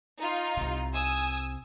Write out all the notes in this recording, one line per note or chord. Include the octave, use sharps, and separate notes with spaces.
D#4 F4
C2 C3
G#5 D#6 E6